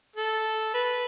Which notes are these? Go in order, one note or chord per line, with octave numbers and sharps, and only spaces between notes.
A4
B4